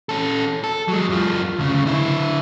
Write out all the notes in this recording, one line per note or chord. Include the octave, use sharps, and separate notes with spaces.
C#4 A4
A4
F#3 G#3
F#2 F4
D2 C#3
D3 E4